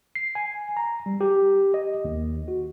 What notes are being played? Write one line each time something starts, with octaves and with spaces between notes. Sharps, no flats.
C7
G#5
A#5
G3
G4
D#5
D#2
F#4